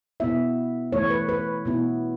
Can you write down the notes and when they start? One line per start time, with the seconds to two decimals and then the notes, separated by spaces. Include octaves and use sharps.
0.20 B2 B3 E4 E5
0.92 E3 A3 E4 C#5
1.10 B4
1.29 B4
1.65 B2 B3 E4